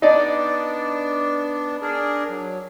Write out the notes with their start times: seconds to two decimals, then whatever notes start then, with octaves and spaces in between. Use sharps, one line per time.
0.02 B3 D4 D#4 D5
1.82 D4 G#4 A#4
2.30 F#3